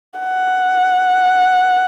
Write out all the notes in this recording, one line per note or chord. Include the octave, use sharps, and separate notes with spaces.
F#5